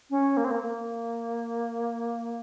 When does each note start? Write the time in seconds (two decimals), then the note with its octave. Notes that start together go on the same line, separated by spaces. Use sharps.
0.10 C#4
0.37 A#3
0.44 C4
0.51 A#3
0.63 A#3